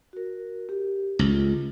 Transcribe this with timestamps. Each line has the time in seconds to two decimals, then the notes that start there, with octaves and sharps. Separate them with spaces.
0.13 F#4 A#4
0.69 G4
1.19 C#2 F4